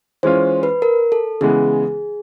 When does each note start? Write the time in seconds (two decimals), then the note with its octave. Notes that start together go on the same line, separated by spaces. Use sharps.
0.23 E3 G#3 C#4 F4 C5
0.63 B4
0.82 A#4
1.12 A4
1.41 C#3 E3 G#3 B3 G#4